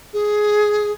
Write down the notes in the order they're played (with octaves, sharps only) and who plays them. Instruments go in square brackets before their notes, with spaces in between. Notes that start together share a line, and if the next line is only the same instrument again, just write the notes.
[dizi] G#4